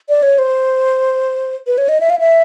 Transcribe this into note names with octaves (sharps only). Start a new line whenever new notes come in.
D5
C#5
C5
B4
C#5
D#5
E5
F5
E5